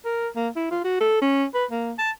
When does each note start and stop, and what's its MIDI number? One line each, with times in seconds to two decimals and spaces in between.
0.05 0.28 70
0.36 0.49 58
0.56 0.71 64
0.71 0.83 65
0.84 0.99 66
1.01 1.19 69
1.21 1.45 61
1.55 1.65 71
1.71 1.93 58
1.99 2.11 81